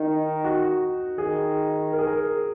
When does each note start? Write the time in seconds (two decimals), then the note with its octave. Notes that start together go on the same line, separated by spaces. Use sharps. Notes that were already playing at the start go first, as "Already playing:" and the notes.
Already playing: D#3 D#4
0.44 F#4
1.18 D#3 G#4
1.93 A#4
1.99 G#4
2.07 A#4